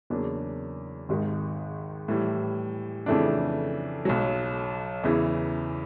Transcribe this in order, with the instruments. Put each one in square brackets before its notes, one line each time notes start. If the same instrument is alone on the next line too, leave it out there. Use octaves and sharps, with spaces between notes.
[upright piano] E2 C#3 F#3 A#3 D4
G#1 G#2 D#3 G#3
A2 E3 G3
F2 C#3 E3 A3 D4
B1 B2 F#3
E2 C#3 E3